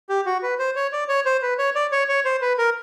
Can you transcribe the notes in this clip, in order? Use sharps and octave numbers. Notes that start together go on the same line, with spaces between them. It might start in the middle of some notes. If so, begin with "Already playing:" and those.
G4
F#4
B4
C5
C#5
D5
C#5
C5
B4
C#5
D5
C#5
C#5
C5
B4
A#4